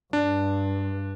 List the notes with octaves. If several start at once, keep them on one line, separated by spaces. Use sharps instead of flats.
G2 D4